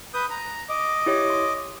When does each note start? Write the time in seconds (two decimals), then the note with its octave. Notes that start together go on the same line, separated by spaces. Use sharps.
0.14 B4 D#6 G6
0.30 A#5
0.69 D#5 D6
1.06 E4 G4 C#5
1.30 C6